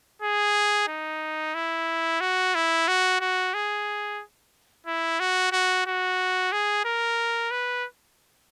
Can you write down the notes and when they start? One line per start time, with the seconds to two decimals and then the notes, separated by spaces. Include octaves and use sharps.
0.22 G#4
0.88 D#4
1.55 E4
2.21 F#4
2.55 E4
2.88 F#4
3.21 F#4
3.54 G#4
4.87 E4
5.20 F#4
5.52 F#4
5.86 F#4
6.52 G#4
6.85 A#4
7.51 B4